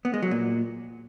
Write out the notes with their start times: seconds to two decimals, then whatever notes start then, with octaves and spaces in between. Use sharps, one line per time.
0.05 B3
0.14 G#3
0.22 F#3
0.31 A#2